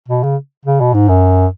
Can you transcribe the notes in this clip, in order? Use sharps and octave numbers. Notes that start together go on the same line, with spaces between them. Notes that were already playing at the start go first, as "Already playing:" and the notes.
B2
C#3
C#3
B2
G#2
F#2